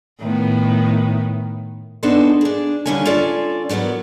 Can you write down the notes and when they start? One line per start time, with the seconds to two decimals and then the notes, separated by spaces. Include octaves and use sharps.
0.19 A2 D#3 B3
2.03 B3 D4 D#4 G#4 A4 C5
2.41 D4 G#4
2.86 D#2 D3 G3 C#4 E4 G#5
3.05 C#4 F4 A4 D5 G#5
3.69 E2 F#3 B3 A#4 D5